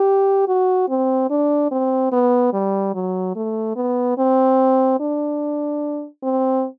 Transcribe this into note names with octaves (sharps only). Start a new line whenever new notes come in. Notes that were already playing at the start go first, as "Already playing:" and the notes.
Already playing: G4
F#4
C4
D4
C4
B3
G3
F#3
A3
B3
C4
D4
C4